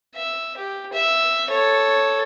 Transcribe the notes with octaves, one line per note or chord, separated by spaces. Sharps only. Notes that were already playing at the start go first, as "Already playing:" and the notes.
E5
G4
E5
A4 C#5